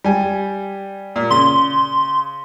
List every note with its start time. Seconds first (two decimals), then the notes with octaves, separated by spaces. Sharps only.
0.04 G3 G#5
1.16 A#2
1.30 C#3 C6